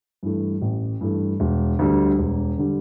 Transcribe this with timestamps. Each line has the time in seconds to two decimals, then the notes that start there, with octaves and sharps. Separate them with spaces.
0.23 G2 E3 A3
0.62 A1
1.01 G2 E3 A3
1.40 E1
1.79 D2 D3 G3
2.18 E1
2.58 D3 G3